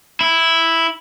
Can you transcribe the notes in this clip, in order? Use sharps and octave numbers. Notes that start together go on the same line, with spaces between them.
E4